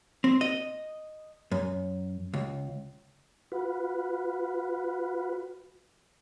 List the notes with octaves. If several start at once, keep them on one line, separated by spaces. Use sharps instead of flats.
C4
D#5
F#2
C#2
F4 F#4 B4